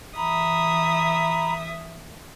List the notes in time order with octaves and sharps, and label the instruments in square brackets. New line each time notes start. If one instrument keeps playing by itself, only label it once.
[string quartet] E3 E5 D#6 [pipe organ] A#5 B5